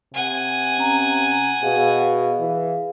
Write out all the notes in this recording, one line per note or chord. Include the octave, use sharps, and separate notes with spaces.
C3 F#5 G#5
C#4 A#5
B2 G#4 F5
E3